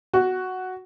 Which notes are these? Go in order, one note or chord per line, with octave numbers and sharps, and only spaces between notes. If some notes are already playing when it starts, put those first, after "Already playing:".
F#4